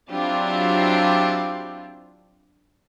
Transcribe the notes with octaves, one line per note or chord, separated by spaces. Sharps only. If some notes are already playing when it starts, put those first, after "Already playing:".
F#3 C4 D4 E4 F4 G4